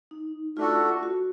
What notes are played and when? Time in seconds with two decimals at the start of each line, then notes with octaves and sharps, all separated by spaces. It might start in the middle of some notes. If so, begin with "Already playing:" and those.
0.11 D#4
0.57 A3 D4 F4 F#4 A4
1.03 F#4